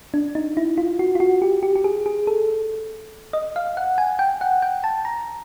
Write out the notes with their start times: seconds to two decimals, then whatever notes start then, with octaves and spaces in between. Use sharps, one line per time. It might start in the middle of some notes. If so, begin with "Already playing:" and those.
0.14 D4
0.35 D#4
0.57 E4
0.78 F4
0.99 F#4
1.15 F4
1.20 F#4
1.42 G4
1.63 G4
1.76 G4
1.84 G#4
2.06 G#4
2.27 A4
3.33 D#5
3.56 F5
3.77 F#5
3.98 G#5
4.19 G5
4.41 F#5
4.62 G5
4.84 A5
5.05 A#5